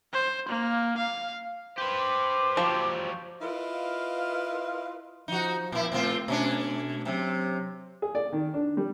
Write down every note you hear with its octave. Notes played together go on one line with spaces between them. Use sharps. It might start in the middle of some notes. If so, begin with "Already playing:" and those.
C5
A#3
F5
G4 B4 C5
D6
F3 F#3 G4
E4 F4 A#4 B4 D#5 F5
F3 D#4 F#4
A#2 E4
A#2 A3 C4 F4
B2 A3 C#4 D4
C3 F#3 C4
G#4
D5
D#3
D4
G3